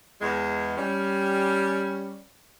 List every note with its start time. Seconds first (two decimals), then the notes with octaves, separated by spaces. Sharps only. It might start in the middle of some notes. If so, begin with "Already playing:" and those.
0.21 E2 G#3
0.77 G3 C#4